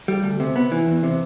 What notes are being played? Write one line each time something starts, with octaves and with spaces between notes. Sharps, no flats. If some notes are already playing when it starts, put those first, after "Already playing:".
G3
D2
C3
B3
E3
E2
C3